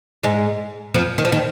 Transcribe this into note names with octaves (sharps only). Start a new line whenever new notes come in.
G#2 G#3
F2 F3
D#3
F3
D#3